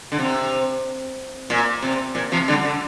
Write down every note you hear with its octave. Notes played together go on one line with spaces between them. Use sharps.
D3
C3
A#2
C3
A#2
C3 F3
D3 G3
D3